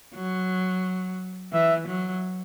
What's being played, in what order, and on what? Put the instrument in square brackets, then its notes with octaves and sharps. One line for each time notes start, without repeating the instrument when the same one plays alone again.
[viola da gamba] F#3
[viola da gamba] E3 [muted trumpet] E5
[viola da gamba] F#3